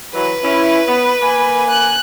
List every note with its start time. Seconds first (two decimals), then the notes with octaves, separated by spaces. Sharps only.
0.14 E3 F#3 B4
0.43 C#4 E4
0.87 B3
1.22 A#3 G#5
1.70 F#6